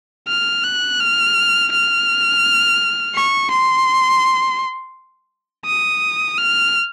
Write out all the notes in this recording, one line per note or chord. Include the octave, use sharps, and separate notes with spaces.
F6
F#6
F6
F6
C#6
C6
D#6
F6